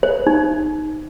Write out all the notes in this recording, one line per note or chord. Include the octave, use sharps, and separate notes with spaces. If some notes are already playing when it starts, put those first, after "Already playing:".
C5
D#4